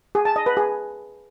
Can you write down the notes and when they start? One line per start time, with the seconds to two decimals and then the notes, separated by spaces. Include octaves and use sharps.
0.15 G#4
0.25 A5
0.36 D#5
0.46 B4
0.57 G#4